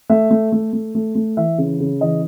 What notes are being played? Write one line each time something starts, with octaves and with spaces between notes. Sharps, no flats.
A3 E5
A3
A3
A3
A3
A3
E3 E5
C#3
C#3
E3 D#5